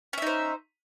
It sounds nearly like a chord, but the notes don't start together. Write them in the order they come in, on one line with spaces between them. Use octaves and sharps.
C#4 E5 D#4 C5